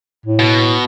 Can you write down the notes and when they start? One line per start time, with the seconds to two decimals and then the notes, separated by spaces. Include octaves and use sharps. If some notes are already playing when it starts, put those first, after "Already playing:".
0.26 A2
0.39 B2